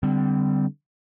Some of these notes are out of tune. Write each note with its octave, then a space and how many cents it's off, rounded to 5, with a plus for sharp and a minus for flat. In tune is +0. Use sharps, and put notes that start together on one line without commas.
D3 +0 G3 +0 C4 -25